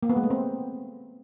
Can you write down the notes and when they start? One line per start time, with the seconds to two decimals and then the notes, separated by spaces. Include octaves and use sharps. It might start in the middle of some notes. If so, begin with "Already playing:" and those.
0.03 A#3
0.09 B3
0.16 G#3
0.23 A3
0.30 C4